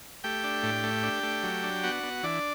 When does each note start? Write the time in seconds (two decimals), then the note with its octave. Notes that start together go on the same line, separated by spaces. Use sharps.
0.24 A3 G4 G5
0.44 D4
0.63 A2
0.84 A3
1.03 D4
1.23 A3
1.43 F#3
1.63 D4
1.83 B3 F#4 F#5
2.03 B3
2.23 E3 D4 D5